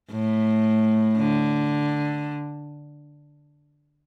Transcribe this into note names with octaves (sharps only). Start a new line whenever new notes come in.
A2
D3